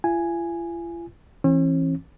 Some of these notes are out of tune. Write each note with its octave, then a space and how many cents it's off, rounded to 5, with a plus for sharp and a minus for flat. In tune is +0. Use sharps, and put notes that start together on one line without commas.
F4 -45 G#5 +0
E3 +0 C#4 -45